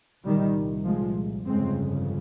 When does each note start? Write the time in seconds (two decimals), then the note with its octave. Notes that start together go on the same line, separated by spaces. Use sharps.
0.24 C2 A#2 D#3 G3
0.85 F3 G#3
1.46 G1 F2 C#3 G#3 C4